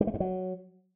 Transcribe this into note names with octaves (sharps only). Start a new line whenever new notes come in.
G3
A3
G2
F#3